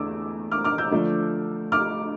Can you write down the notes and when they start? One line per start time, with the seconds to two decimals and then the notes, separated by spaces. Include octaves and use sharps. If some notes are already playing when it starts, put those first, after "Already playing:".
Already playing: E2 D3 A3 D6 E6
0.51 D6 F6
0.64 D6 F6
0.78 E6 G6
0.91 D3 F3 A3 D4
1.72 D6 F6